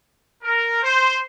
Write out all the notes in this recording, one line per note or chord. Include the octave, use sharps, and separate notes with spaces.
A#4
C5